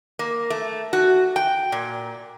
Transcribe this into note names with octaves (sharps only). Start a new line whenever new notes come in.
A#3
A3
F#4
G5
A#2